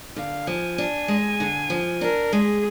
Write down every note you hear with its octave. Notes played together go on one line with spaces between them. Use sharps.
D3 F5
F3 G#5
D4 G#5
G#3
D3
F3
D4 A#4
G#3 G#4